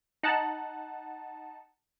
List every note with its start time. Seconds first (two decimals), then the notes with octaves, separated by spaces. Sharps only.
0.23 D#4 F#5 A5